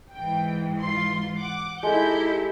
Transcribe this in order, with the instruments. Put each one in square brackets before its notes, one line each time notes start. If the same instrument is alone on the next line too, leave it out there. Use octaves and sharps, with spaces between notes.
[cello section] G#2 E3 [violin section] G5
[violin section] F4 C6
F#5 D6
[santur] G#3 A4 [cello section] D#4 E4 G4 [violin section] G6